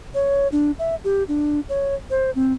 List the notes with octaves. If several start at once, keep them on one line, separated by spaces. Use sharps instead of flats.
C#5
D4
E5
G4
D4
C#5
C5
C4